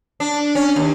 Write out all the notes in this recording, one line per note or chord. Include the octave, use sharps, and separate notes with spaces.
D4
C#4
D#2